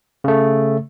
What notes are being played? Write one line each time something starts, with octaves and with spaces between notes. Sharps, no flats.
C#3 A3